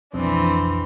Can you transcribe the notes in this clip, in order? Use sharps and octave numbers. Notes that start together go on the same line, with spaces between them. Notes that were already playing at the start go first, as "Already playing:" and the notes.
B1 F2 E3 C4 D4